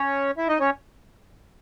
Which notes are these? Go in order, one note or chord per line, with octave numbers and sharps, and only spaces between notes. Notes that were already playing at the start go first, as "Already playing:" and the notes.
Already playing: C#4 C#5
E4 E5
D#4 D#5
C#4 C#5